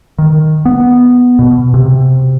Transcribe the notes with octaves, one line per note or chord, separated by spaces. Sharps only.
D#3
B3
B2
C3